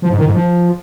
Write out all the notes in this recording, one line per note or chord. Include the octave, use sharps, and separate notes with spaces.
F3
G#2
D#3
G#2
F3